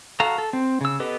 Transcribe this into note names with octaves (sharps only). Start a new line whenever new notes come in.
F#4 A4 F5 A#5
A4
C4
C#3 E6
B3 G4 A4 B4 D#5